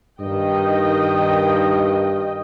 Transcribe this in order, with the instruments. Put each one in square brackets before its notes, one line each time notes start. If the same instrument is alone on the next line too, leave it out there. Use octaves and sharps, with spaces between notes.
[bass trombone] G2 [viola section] D#3 D#5 G5